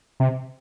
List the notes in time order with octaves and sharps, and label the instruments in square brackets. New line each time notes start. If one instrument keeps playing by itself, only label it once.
[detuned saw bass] C3